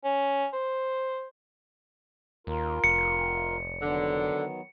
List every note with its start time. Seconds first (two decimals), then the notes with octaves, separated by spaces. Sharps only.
0.04 C#4
0.53 C5
2.47 D#2 F4 A#4
2.84 F1 C#7
3.82 D3 D#3 F#3 B3